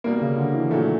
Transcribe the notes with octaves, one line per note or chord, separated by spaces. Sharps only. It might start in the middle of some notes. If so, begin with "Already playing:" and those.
B2 G3 A#3
C#3
D3
E3
A#2 F3 F#3 A3